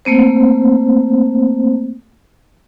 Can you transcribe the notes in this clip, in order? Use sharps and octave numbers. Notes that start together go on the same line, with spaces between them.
A3 A#3 C4 C5